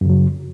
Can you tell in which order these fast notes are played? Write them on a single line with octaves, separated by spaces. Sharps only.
F#2 C#3 F#3